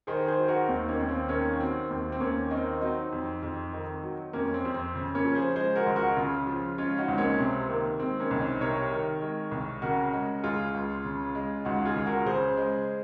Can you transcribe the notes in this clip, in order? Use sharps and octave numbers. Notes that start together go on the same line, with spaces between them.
D#3 G#4 C5
G#4 C5
F#3
F#4 A#4
D#2 C4 D#4
A#3 C#4
D#2
C4
D#3 A#3 C#4
F#3 C4
D#2 C4
C4
D#2 A#3 C#4
D#3 C4 D#4
F#3 C4 D#4
F2
F2
D#3
F#3
F2 A#3 C#4
C4
F2
C4
C#3
A#3 C#4
F3
G#4 C5
G#3 G#4 C5
F#4 A#4
C#2
F#4 A#4
C#3 F4 G#4
F3
G#3 C#4 F4
D#4 F#4
C#2 C4
A#3 C#4
C3 C4
D#3 A#3
G#3 C4
A#3 C#4
C2
C4 D#4
C3 A#4 C#5
D#3
G#3
C2
C#3 F#4 A#4
G#3
C#2 F4 G#4
C#2
C#3
G#3
C#2 D#4 F#4
F4 G#4
C#2
F#4 A#4
C#3 G#4 C5
G#3